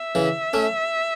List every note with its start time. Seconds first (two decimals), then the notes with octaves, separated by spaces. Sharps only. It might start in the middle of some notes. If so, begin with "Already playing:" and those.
Already playing: E5
0.15 C#3 E3
0.53 A3 C#4